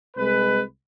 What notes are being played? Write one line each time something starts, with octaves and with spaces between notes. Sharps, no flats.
C2 G#3 B4